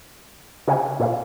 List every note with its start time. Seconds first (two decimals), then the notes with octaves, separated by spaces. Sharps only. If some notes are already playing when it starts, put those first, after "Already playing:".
0.67 C#3
1.00 A#2